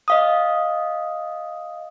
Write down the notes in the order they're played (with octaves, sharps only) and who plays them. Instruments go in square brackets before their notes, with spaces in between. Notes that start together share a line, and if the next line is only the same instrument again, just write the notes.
[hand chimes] D#5 F5 D#6